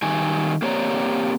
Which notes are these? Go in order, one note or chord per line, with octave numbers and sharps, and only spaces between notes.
D#3 G3 G#5
A#3 C4 G4 C#5 D5 A#5